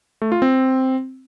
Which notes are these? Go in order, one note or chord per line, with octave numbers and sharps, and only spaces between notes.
A3
F4
C4